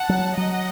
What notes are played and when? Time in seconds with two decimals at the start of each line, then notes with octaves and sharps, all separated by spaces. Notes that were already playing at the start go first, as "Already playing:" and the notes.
Already playing: F#5 A5
0.09 F#3
0.37 F#3 D#5 F#5